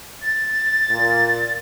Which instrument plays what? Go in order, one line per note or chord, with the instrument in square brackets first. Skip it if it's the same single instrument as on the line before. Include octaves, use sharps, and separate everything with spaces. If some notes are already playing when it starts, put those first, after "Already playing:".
[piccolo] A6
[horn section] A#2